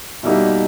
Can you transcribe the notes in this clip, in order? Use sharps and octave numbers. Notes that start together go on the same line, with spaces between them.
B2 G3 A#3 D#4 E5